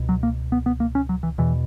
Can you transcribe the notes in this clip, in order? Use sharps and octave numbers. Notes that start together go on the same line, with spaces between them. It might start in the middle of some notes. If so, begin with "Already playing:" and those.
Already playing: C#2 B2
F#3
A#3
B3
B3
A#3
C#4
F#3
E3
E2 B2 E3